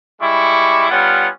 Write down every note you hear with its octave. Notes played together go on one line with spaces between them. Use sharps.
G3 G#3 E4 C#6 D6
G3 B3 C#4 F4 F#5